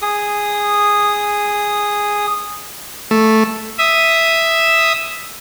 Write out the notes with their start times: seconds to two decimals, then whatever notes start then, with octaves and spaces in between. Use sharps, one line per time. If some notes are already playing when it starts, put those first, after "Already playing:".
0.02 G#4 D#6
3.11 A3
3.78 E5 D#6